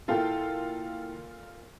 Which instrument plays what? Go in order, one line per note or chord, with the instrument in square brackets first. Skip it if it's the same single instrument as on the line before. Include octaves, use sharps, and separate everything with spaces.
[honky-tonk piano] A#2 F4 A4 [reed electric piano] E4 G5